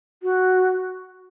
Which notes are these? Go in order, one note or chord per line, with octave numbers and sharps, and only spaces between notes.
F#4